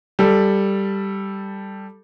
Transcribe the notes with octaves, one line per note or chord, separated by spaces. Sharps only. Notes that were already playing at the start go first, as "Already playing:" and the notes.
G3 A4